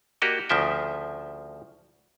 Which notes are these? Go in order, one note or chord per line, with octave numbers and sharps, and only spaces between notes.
A#3 F#4 G4 A#4 D5 D#5
D2 C#3 F3 E5 G5